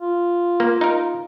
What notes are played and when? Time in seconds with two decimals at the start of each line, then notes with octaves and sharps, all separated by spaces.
0.01 F4
0.60 A#3
0.81 D#4 A#4